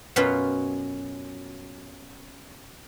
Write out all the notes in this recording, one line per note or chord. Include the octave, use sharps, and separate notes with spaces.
F#2 B2 F#3 C#4 F4 B4